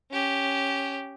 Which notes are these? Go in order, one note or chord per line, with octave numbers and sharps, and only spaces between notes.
C#4 G4